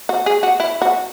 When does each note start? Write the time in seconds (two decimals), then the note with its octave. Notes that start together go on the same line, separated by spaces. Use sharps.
0.09 F#4
0.26 G#4
0.43 F#4
0.60 E4
0.82 F#4